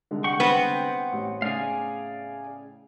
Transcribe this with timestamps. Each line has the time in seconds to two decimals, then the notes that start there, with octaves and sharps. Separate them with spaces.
0.11 C2 D3 G#3
0.24 F#5 G5 C#6
0.40 B3 C4
1.12 A1
1.42 A2 C#3 G#4 D5 F5